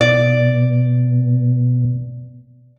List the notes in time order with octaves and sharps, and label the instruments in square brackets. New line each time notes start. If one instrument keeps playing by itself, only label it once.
[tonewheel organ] B2 [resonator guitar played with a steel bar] D5